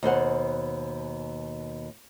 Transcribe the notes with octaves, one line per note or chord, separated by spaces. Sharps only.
D#2 B2 C5 F#5